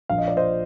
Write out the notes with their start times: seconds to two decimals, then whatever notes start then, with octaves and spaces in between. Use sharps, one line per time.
0.09 A#1 A#2 F3 F5
0.18 D#5
0.28 D5
0.37 C5 D#5